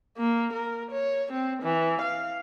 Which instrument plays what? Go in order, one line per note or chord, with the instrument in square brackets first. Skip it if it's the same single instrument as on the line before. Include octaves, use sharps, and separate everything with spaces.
[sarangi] A#3
A#4
C#5
C4
E3
F5